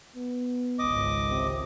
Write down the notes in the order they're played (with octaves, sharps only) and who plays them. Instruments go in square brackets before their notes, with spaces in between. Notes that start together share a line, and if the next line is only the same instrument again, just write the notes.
[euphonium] B3
[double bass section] G#1 C#2 G#2 [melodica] D#5 D6
[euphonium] C3